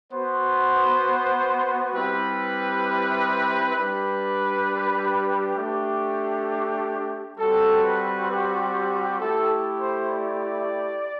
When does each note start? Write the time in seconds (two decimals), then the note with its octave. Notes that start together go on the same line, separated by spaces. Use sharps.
0.13 B3 F#4 C5
1.94 G3 C4 E4 G4 B4
3.75 G3 D4 G4 B4
5.57 A3 D4 G4
7.39 G3 C4 F#4 A4
7.84 B4
8.30 G4
9.20 A3 E4 G4 A4
9.80 C5
10.11 D5